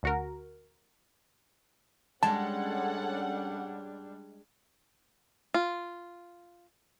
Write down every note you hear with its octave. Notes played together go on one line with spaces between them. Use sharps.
D2 F#4 A#4
G3 G#3 C#4 D4 A4 F#5 A5
F4